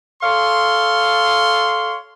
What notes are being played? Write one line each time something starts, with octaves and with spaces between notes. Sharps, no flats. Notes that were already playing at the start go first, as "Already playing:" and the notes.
A4 C#5 F5 C6